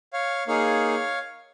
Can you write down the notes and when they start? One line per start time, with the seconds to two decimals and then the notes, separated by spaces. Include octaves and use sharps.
0.13 C#5 F5
0.47 A#3 D#4 G#4 C#5 F5